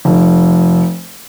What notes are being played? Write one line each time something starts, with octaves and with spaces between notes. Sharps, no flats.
F1